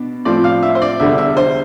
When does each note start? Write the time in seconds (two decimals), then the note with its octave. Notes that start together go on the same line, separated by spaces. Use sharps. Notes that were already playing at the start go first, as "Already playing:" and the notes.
Already playing: B2 B3 D4
0.25 A2 F3 C4 D5
0.44 F5
0.63 E5
0.75 C5
0.82 D5
1.00 E2 D3 G3 E5
1.18 E5
1.37 C5